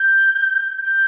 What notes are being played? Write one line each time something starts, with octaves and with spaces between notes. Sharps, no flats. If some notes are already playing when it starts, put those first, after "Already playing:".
Already playing: G6
G6